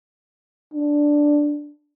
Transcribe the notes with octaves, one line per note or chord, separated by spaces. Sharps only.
D4